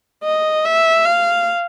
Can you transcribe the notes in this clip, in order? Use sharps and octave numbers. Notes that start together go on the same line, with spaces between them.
D#5
E5
F5